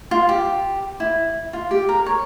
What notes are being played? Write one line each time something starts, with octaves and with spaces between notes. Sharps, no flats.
F4
G4
E4
F4
G4
A#4
C#5